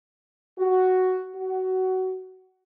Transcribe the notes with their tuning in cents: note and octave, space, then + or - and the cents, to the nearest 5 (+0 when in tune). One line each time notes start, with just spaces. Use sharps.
F#4 +5
F#4 +20